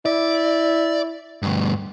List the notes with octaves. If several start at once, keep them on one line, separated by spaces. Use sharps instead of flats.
E4 D5
D2 G2